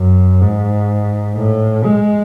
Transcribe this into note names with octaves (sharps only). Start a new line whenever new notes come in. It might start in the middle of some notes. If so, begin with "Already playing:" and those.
Already playing: F#2
G#2
A2
G#3